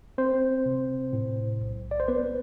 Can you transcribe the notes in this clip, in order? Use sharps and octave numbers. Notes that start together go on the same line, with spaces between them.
C4 C5
C3
A2
B1
D5
C5
B3 B4